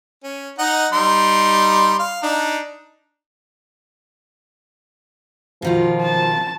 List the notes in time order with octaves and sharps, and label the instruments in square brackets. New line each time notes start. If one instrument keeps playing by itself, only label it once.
[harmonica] C#4
D#4 D#5 F#5
G3 D#4 C6
F5
D4 D#4
[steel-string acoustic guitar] B2 D#3 F4 [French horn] F3
[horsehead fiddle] A5